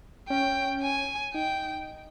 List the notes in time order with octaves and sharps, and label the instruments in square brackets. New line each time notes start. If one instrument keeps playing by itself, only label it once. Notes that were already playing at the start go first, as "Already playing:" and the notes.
[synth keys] C#4 [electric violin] G5
[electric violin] G#5
[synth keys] D#4 [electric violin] G5